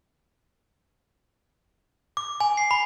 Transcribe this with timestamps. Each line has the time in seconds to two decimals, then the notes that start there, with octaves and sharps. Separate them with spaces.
2.17 D6
2.40 G#5
2.57 C7
2.71 B5